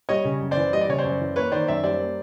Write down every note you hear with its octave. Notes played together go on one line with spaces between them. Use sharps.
G3 C#5 D#5
C#3
F#2
C5 D5
E3
G3 D#5
D5
C#3 C#5
C5 D5
F#2
E3
A#3 B4 C#5
D#3 C5 D5
F#2 D5 E5
G3 C5 D5
A#3